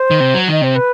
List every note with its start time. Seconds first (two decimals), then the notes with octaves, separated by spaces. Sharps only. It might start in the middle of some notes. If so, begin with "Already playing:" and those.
Already playing: C5
0.11 D#3
0.20 C3
0.34 F#3
0.48 D#3 D#5
0.61 C3 C5
0.75 B4